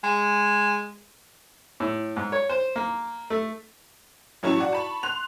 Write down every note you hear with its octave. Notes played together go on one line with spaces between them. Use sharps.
G#3
A2
G#2
C#5
C5
A#3
A3
A1 F#3 C#4 E4 A5 C#6
F#4 D5 F#5
A5 B5 C#6
C6 F#6 F7